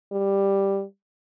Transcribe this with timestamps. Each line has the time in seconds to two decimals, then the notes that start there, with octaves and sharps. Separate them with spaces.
0.12 G3